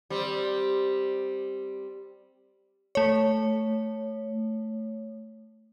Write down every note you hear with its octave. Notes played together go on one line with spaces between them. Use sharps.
G3 C4
A3 C#5